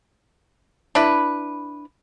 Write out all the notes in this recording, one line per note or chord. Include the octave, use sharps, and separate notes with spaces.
D4 E4 B4